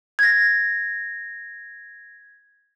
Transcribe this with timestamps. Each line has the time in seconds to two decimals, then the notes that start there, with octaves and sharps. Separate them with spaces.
0.19 G#6 A#6